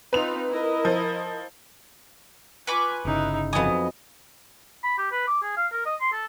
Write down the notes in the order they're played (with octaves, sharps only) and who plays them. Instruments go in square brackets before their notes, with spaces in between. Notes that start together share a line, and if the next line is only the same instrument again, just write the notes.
[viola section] C4 D#4 F4 [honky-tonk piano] B4 F7
[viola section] E4 A#4 D#5
[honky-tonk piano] F3
[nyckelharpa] F4 G#5 [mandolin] B4 C#6 D6
[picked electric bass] G1 C#3 [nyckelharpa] D#4 E4
[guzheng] F2 F#3 G#5 [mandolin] B3 D#6 [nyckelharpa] D#5
[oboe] B5
G4
B4
D6
G#4
F5
A#4
D#5
C6
A4